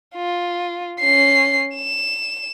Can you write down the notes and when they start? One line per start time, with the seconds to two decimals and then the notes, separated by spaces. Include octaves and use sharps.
0.16 F4
1.00 C#4 C7
1.75 E7